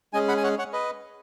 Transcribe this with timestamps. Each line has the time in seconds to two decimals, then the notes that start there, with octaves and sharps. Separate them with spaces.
0.13 G#3 C#4 G#4 D#5 G#5
0.28 F#5 B5
0.37 G#5
0.43 C#5 F#5
0.58 C#5 F#5
0.73 B4 D#5